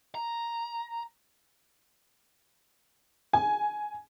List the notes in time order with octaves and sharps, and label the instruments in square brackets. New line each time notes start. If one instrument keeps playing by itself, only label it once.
[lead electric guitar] A#5
[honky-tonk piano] G#5